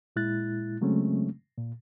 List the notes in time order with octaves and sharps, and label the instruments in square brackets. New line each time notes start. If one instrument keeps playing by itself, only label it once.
[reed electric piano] A#2 G#3 E4 F#6 A6
C#3 F#3 G#3 A3 C4 C#4
A#2